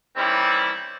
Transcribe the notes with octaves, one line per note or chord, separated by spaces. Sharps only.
D#3 E3 G3 C4 C#4 E4